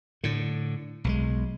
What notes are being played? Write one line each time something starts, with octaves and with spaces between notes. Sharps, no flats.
A2 D3
B1 D#3 G#3